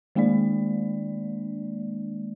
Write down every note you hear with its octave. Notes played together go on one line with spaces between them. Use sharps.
D#3 G#3 A#3 D4 D5